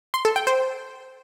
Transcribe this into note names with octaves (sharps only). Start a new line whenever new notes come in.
C6
A4
G5
C5